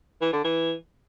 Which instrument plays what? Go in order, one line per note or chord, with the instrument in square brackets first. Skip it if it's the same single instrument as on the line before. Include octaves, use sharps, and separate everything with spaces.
[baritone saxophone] E3
D3
E3